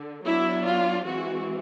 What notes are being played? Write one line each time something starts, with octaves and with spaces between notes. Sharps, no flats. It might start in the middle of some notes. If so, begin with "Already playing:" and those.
Already playing: D3
F#3 B3 D4 E4
F4
E3 G#3 C4 F#4